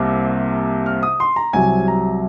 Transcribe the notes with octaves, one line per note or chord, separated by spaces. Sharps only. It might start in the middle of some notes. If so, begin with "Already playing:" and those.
Already playing: C2 C3 A#3
F6
D#6
C6
A#5
C2 C3 F#3 G#5
A#5